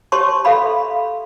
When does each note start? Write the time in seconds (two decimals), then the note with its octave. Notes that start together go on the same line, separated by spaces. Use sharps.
0.12 G4 C#5 A5 C6 C#6
0.45 A4 E5 F5 B5